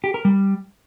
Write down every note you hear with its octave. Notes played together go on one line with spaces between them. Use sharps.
G4
A#4
G3